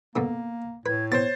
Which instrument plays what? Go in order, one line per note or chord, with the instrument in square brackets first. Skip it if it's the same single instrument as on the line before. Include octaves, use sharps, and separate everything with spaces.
[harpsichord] F#2 B2 D3 [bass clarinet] A#3
[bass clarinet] A2 [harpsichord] B4 [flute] G#6
[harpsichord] B2 C4 [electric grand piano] C5 A6 [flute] C#5